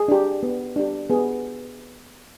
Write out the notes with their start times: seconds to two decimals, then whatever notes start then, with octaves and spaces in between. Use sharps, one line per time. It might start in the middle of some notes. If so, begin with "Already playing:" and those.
Already playing: G#4
0.08 D4 G4
0.43 B3
0.76 D4 G4
1.10 B3 G#4